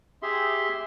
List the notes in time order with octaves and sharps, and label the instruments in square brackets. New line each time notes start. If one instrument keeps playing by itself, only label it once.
[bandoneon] G4 G#4 E5 C6